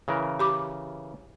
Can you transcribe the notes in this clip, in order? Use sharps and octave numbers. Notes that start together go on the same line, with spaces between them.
C#3 E3 A#4
G4 B5 D6